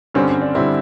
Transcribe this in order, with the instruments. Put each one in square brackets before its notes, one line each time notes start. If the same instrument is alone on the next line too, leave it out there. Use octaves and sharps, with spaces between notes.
[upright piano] G2 D3 G3 C4 [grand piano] C#4
[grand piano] C#4
D4
[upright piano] D3 G3 C4 [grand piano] E4